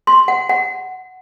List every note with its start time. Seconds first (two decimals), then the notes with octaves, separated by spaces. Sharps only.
0.07 C6
0.28 F#5
0.49 F#5